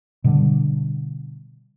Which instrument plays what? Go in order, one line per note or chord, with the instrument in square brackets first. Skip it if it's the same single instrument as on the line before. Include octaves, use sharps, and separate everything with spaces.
[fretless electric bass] B2 D3 G3